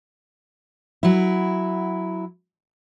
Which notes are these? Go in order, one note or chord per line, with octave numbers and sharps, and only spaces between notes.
F#3 E4